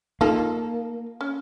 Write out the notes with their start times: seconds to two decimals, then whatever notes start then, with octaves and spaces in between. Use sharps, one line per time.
0.21 A#3 D#4 F4 A4
1.21 C#4